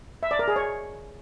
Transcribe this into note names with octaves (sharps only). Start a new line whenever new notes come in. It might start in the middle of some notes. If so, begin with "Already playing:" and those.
E5
D5
A#4
G#4
C#5